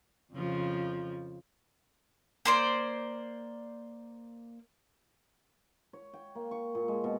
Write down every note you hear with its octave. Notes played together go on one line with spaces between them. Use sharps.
F2 C#3 F3
A#3 C5 D5
C#5
G5
A#3
C#6
A#2
G#3
B2